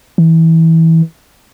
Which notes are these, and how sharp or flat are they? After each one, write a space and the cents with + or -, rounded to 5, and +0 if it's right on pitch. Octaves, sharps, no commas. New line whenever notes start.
E3 -20